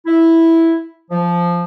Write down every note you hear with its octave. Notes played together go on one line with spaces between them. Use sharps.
E4
F3